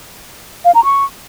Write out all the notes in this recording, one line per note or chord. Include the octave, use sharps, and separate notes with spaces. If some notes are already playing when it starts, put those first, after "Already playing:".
F5
A#5
C#6